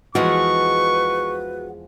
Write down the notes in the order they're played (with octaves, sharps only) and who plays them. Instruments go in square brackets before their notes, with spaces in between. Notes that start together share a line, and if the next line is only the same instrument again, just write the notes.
[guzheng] E2 F3 G#3 [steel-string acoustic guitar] F#4 [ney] B4 [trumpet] C#6